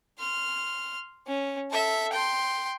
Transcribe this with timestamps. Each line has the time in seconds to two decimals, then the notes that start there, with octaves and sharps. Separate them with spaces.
0.19 C6 F6
1.27 C#4
1.71 A4 E5
2.12 G5 C6